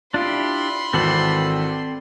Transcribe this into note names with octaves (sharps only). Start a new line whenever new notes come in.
D4 E4 F4 G4 B5 C6
G#1 E3 C4 A4 D5 F#7